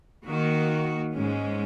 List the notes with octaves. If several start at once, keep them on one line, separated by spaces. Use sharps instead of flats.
D#3 A#3 F#4
G#2 G#3 C#4